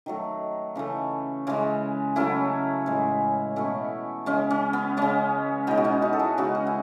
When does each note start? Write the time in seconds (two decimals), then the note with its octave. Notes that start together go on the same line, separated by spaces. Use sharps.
0.06 D#3 F#3 A3
0.75 C#3 E3 A3
1.47 C#3 E3 G#3
2.16 C#3 F#3 A3 C#4 E4
2.86 A2 E3 G#3
3.56 B2 A3 C#4 E4
4.26 C#3 G#3 C#4
4.50 C#4
4.73 B3
4.97 C#3 G#3 C#4
5.67 B2 G#3 B3 D#4
5.77 F#4
5.84 C#4 E4
6.02 D#4 F#4
6.13 A4
6.19 E4 G#4
6.38 C#3 G#3 D#4 F#4
6.55 C#4
6.67 E4